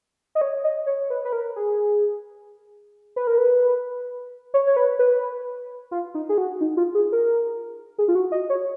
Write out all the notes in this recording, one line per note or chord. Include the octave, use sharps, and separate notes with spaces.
D#5
C#5
D#5
C#5
B4
B4
A#4
G#4
B4
A#4
B4
C#5
C#5
B4
B4
F4
D#4
G#4
F#4
D#4
F4
G#4
A#4
G#4
F4
F#4
D#5
C#5